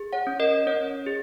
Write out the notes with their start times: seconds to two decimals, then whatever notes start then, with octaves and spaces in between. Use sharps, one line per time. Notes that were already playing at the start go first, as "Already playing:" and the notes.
Already playing: G#4
0.13 C#5 F#5
0.27 C#4
0.40 A#4 D#5
0.67 C#4 C#5
1.06 G#4